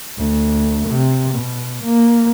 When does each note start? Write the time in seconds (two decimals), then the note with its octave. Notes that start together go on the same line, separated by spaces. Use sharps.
0.17 D2
0.89 C3
1.35 B2
1.85 A#3